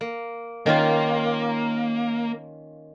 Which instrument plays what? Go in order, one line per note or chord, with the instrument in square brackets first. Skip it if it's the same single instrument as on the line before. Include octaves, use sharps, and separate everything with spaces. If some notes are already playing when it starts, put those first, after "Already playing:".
[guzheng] A#3
[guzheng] D#3 C#4 F4 [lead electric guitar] A#3